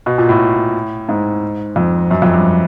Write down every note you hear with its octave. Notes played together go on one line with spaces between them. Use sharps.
B2
A#2
A2
G#2
F2
F#2
F2
G2